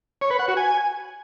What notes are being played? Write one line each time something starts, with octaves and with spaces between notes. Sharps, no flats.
C#5
B4
F#5
F#4
G#5